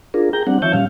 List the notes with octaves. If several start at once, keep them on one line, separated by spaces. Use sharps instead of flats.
D4 F4 G#4 A#4
G#4 G5 A#5 G6
G3 C4 D4 F#5
D#3 F3 C#5 E5 A5 G6
A#2 G3 C#4 F5